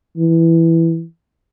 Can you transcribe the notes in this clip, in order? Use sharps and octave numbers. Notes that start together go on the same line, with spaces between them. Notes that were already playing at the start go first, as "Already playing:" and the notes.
E3